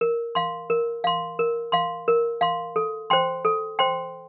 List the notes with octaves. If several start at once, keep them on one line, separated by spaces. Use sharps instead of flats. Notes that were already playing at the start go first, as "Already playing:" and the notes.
A#4
F5 C6
A#4
F5 C6
A#4
F5 C6
A#4
F5 C6
A4
C5 G5 C6
A4
C5 G5 C6